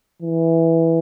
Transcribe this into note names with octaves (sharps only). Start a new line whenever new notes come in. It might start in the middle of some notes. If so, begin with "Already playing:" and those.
E3